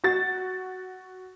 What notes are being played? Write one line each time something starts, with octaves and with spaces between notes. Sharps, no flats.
F#4 A6